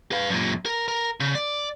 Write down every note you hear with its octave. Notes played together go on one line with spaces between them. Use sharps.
B4 F5
F#2 A#2
A#4
A#4
C#3
D5